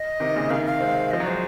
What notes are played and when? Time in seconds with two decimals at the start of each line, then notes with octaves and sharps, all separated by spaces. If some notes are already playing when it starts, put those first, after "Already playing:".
Already playing: D#5
0.20 C3 D#3
0.35 A#2 C#3
0.50 C3 D#3 F5
0.66 F5
0.81 G#3 C4
1.11 F3 D#5
1.20 F#3
1.27 G#3 C5